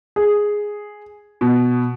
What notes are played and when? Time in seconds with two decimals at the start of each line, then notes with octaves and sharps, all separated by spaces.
0.16 G#4
1.41 B2